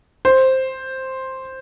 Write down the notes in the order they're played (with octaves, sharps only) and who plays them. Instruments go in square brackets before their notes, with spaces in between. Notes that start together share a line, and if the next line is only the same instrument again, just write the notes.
[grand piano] C5